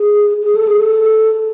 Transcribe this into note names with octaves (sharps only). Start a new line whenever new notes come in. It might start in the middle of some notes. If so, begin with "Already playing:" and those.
Already playing: G#4
G#4
A4
G#4
A4